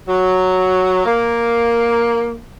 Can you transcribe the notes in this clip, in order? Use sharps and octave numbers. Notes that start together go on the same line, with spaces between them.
F#3
A#3